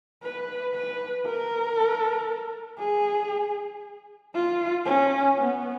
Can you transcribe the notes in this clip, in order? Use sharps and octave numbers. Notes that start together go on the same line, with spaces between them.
B4
B4
A#4
G#4
F4
C#4
B3